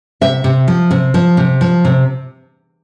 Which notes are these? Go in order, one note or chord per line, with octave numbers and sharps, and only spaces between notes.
C3 E5
C3
F3
C3
F3
C3
F3
C3